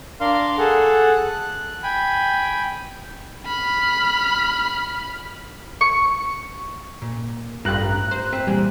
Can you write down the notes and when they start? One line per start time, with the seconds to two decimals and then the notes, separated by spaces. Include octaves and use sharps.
0.20 D4 A#4 F5 C6
0.58 G#4 A4 F#5
1.16 F#6
1.83 G5 G#5 B5
3.46 B5 F6
5.81 C#6
7.02 A#2
7.65 A1 G2 F4 G4 B4 A#5 F#6
8.11 C5
8.32 C4 B4 E5
8.47 A#2 E3 G3 G#4